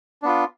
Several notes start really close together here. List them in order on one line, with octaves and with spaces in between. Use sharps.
D4 B3 F4